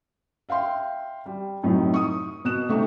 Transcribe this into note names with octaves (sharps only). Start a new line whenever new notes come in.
E5 F5 G5 C6
G3
F#2 A2 C3 F#3 D#4
C#6 D#6
B2 F#6 E7
C3 A3 C4 D#4 C#6